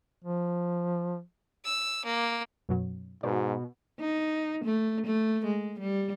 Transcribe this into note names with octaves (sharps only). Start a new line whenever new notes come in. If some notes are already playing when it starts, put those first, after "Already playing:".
F3
E6
A#3
F#2 B2 F#3
G#2 B2 D5
D#4
A3
A3
G#3
G3